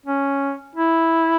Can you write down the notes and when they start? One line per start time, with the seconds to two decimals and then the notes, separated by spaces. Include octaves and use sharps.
0.06 C#4
0.75 E4